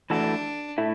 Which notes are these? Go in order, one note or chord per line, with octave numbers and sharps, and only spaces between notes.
E3 A3 D4 F#4 A4
A2 A3 E4